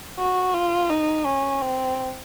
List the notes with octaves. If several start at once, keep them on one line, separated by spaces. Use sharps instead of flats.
F#4
F4
D#4
C#4
C4